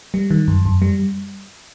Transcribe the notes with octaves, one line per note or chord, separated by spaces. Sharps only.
G3
D#3
F#2
F#2
G3